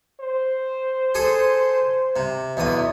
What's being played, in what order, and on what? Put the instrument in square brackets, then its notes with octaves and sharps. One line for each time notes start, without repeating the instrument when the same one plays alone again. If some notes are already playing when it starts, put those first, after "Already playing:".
[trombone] C5
[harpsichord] G#4 A4 D#6
C3
[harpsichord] B1 E2 D#6 [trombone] B2